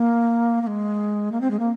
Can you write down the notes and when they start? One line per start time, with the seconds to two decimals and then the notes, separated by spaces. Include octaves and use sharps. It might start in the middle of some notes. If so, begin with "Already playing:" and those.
Already playing: A#3
0.62 A#3
0.67 G#3
1.32 A#3
1.41 C4
1.51 G#3
1.59 A#3